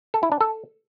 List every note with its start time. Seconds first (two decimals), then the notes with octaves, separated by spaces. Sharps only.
0.14 A4
0.23 E4
0.32 D4
0.41 A4